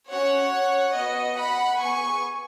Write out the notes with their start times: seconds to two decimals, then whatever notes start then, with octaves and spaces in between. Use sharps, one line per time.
0.10 C#4 F#4 C#5 F#5
0.96 B3 F#4 D#5
1.38 F#5 B5
1.80 B3 G#4 G#5 C#6